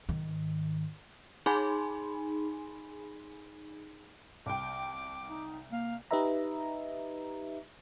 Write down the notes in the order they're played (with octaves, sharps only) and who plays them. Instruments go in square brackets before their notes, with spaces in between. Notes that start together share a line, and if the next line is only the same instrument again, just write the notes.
[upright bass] G#2 D#3
[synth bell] D#4 G#4 G#5 B5 C6
[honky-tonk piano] C2 G5 [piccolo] D6
[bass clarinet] D#4
[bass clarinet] A#3 [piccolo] F5
[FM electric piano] D#4 G4 B4 D#5 E5 A#5